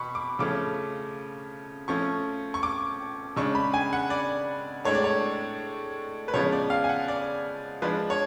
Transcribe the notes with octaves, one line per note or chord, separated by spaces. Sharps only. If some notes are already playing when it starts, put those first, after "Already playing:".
Already playing: B2 B5 C#6
D6
C#3 F3 A3 C#4 D6
F3 A3 C#4 C#6
C#6
D6
C#3 G#3 D4 C#6
B5
G#5
F#5
D5
A2 G#3 D4 C#5
D5
C#5
B4
C#3 F3 G#3 B3 C#5
D5
F5
G#5
F#5
D5
F3 G#3 D4 B4
C#5